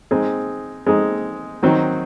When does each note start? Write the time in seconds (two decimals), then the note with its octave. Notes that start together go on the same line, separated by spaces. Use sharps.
0.11 G#3 C4 D#4 G#4
0.86 G#3 C4 D#4 G#4
1.63 D#3 F#3 C4 D#4 F#4